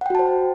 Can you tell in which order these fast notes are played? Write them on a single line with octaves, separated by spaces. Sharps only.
F#5 G5 F#4 A5 C5